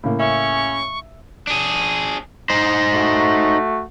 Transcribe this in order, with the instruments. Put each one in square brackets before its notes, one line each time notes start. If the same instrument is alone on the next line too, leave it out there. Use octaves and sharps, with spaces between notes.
[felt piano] A2 C#3 A#3
[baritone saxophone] C#4 [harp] E5 [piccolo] C#6
[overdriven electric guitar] D4 G#4
D#4 C5
[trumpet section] A3 F#4